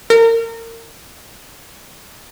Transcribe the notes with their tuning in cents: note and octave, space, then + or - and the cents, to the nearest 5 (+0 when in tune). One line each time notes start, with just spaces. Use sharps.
A#4 -30